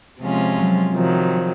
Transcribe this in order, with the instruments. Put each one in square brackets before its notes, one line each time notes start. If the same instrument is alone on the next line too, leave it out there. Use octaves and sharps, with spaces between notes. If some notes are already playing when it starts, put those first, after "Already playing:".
[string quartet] C3 F3 G#3 C#4 F4
[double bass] F#3
[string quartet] C3 D#3 F#3 [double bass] F3